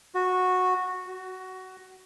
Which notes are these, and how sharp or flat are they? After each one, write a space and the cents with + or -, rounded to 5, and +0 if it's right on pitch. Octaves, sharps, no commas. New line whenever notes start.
F#4 -10
F#4 +15